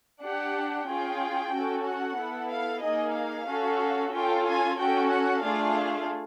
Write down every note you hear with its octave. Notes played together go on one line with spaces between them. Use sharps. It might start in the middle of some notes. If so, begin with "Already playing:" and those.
D4 G4 F#5
C#4 F4 G#4 G5
C#4 F#4 A4
F#5
B3 E4 A4
F5
A#3 D#4 G#4 D#5
F5
C#4 F#4 A4
C#4 F4 A4 G5
G#5
C#4 F#4 A4 G5
F#5
A3 D4 F4 G#4 F5